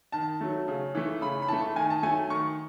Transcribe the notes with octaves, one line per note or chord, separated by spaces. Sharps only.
D#3 A5
F#3 A3
C#3
E3 A3
C#3 B5
B5
E3 A3 A5
D#3 G#5
A5
F#3 A3 G#5
D#3 C#6